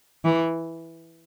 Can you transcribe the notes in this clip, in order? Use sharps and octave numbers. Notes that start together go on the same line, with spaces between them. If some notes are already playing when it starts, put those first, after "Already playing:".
E3